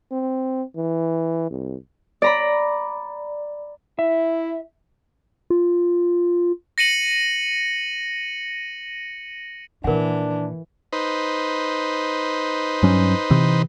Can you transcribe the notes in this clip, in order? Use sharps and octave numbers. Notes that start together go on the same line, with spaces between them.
C4
E3
C2
D5 A#5 B5
E4 E5
F4
A#6 C#7 D#7 F#7
A#2 D#3 E3 D4 A#4 F#5
D#4 B4 C5
G2 F#3 C#4
C3 E3